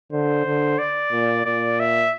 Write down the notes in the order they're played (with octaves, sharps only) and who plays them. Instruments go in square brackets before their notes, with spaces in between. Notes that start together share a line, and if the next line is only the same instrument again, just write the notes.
[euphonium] D3 [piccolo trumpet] C5
[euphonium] D3
[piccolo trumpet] D5
[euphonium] A#2
[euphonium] A#2 [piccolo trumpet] D5
[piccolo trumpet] E5